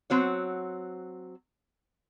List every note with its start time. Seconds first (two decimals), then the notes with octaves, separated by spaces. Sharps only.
0.10 F#3 C4 F#4 C#5